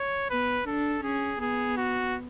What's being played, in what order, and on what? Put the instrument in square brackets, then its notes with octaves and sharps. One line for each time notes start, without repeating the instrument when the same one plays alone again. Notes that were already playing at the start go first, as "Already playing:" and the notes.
Already playing: [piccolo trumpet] C#5
[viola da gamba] B3 [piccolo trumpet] B4
[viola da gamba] D4 [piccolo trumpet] A4
[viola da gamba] C#4 [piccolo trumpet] G#4
[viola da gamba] B3 [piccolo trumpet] G#4
[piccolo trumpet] F#4